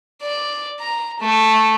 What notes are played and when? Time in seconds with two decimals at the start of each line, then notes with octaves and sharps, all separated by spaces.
0.22 D5
0.80 A#5
1.19 A3